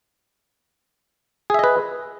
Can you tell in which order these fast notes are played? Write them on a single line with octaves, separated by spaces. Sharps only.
G#4 E5 D#5 B4